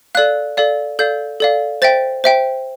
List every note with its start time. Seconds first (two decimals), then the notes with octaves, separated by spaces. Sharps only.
0.15 A4 D5 F5 F#6
0.57 A4 D5 F5
0.99 A4 D5 F5 G6
1.40 A4 D5 F5
1.82 C5 E5 G5 A6
2.24 C5 E5 G5